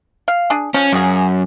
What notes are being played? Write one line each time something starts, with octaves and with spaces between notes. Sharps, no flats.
F5
D4 G#4
F3 C#4
F#2 C#3 G#4